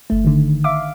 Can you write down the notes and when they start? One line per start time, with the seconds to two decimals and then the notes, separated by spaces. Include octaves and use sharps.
0.10 G1 A3
0.25 D3 D#3
0.64 E5 F5 D6